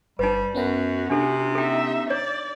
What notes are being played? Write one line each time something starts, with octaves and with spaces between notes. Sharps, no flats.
G1 G3 D#4 B4
F#2 B3 C#4 F#4 F#5
C3 D4 A4
D#4 A4 E5 G5
C#5 D5